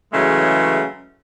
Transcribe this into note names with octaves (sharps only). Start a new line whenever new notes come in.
C#3 E3 F#3 G#3 A3